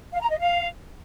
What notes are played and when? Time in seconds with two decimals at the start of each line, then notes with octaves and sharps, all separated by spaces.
0.12 F5
0.21 A#5
0.30 D#5
0.38 F5